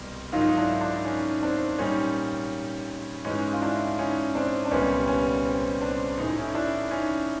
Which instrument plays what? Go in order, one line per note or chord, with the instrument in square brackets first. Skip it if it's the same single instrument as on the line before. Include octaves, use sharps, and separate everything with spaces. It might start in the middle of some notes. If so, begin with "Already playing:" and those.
Already playing: [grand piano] C2 B2 G3
G#2 D#3 F#3 D#4 F4
D#4
D4 E4
D4 E4
C#4 D#4
C4 D4
A#2 G3 C#4 D#4
G#2 E3 G#3 C#4 D#4
F4
D4 E4
C#4 D#4
C4 D4
D4
C2 A#2 G3 B3 C#4
B3 C#4
C4
C4 D4
A2 E3 A3 D#4
E4
C#4 D#4
D4 E4
C#4 D#4